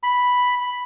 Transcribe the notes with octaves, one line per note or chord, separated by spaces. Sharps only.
B5